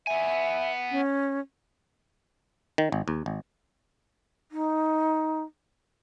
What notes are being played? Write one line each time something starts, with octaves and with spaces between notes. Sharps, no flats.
B3 E5 G#5
C#4
D#3
G#1
D#2
G#1
D#4